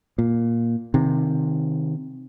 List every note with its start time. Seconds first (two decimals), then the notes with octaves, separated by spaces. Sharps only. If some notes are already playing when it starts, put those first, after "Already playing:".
0.18 A#2
0.94 C3 D#3